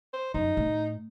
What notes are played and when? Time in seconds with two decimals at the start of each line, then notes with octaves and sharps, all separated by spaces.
0.14 C5
0.34 F#2 D#4
0.57 A2